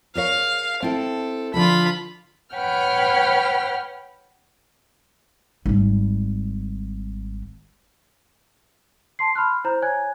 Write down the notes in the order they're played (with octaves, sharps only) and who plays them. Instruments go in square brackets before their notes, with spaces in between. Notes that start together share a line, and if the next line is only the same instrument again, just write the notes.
[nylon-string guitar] G#4 A#4 C#5 [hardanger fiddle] F5
[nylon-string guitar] C4 E4 [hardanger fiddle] A4
[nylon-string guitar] D3 F3 A4 [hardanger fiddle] F4 B5
[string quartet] B4 C#5 F#5 G5 F6
[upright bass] G#1 G3
[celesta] A5 C6 C7
B5 C6 F6 F#6
E4 C5 A#5 G6
C#5 G#5 F#6 G#6